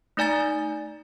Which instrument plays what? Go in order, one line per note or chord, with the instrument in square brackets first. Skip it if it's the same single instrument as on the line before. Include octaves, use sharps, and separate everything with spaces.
[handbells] A3 D#4 D5 G#5 A#5 A6